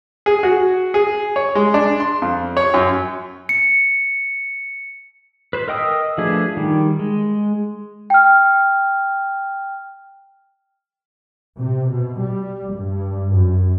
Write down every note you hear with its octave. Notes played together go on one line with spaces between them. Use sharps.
G#4
F#4
G#4
C#5
G#3
D4
C6
F2
C#5
F#2
C#7
B4 C5
A#4 D#5 G5 D#6 E6
F3 A3 D4 G#4 B4
D#3 G3
G#3
G5 F6
C3
B2
G3
G2
F#2